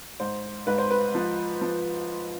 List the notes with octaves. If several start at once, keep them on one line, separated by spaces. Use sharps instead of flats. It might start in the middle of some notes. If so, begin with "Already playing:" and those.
G#2 C5
G#2 B4
C5
B4
F3
F3